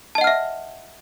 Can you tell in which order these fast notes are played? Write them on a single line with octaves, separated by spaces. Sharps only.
A5 D#5 F#5 F6 E5